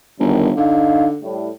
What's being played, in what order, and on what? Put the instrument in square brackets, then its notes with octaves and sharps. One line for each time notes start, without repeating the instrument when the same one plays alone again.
[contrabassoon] G1 [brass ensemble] F#2 D#3
[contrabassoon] D3 [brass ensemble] D#4 F5
[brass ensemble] A2 G3